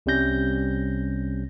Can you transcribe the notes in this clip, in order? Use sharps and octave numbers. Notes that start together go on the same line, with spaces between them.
C2 C3 G3 C#4 G6 A#6